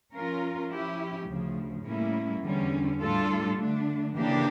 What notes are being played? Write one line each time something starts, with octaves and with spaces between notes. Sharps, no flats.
F3 C#4 F4 A#4
F3 C#4 E4 G4
D2 C#3 F3
A2 G3 A#3 C#4 E4
E2 D3 G3 C#4
A2 G3 D4 F4 A4
D3 A3 D4
C#3 E3 A#3 D4 G4